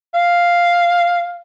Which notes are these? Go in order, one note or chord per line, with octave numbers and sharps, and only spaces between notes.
F5